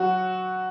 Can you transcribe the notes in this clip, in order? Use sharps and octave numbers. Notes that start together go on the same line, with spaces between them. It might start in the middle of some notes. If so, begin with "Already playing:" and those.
Already playing: F#3 F#4